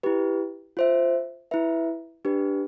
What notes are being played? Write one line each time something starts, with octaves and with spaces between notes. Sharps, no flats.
E4 G4 B4
F4 C5 E5
E4 B4 E5
D4 G4 B4